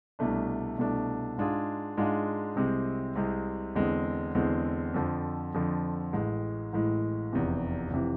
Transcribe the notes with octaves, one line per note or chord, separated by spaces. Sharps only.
C2 B2 A3 D4
C2 B2 A3 D4
G#2 G#3 D4 F4 G#4
G#2 G#3 D4 F4 G#4
C2 C3 G#3 C4
C2 C3 G#3 C4
E2 D3 G#3 C4
E2 D3 G#3 C4
F2 D3 F3
F2 D3 F3
A1 A2 G#3
A1 A2 G#3
F1 E2 C3 E3
F1 C3 E3